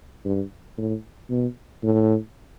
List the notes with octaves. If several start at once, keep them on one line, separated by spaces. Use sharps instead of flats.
G2
A2
B2
A2